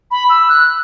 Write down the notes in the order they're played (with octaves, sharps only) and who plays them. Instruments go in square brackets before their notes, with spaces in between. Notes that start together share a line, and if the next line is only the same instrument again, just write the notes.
[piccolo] B5
E6
F#6